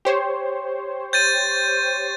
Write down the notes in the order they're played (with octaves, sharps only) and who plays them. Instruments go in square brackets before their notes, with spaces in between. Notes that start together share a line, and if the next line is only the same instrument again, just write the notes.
[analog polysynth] G4 C5 C#5
[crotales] G6 A6 D#7